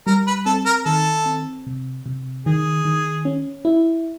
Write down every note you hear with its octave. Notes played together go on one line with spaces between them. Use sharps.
G3 A#4
B4
C4 A4
A#4
D#3 A4
C4
C3
C3
D#3 G#4
D#3
C#4
E4